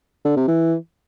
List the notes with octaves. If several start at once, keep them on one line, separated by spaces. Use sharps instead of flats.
D3
C3
E3